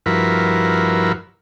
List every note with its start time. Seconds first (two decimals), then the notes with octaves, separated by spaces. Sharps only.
0.06 G2 F3 E4 F#4 A#4 B4